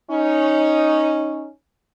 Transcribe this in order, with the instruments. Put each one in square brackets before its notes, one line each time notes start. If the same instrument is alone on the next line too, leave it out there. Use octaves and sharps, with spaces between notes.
[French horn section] C#4 D#4